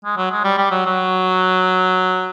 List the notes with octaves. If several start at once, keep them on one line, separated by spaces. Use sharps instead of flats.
G#3
F#3
G#3
G3
G3
F#3
F#3